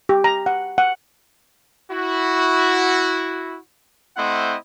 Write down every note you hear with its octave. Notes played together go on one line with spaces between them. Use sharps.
G4
A#5
F#5
F#5
E4 F#4
A3 C4 E4 C5 D#5 F#5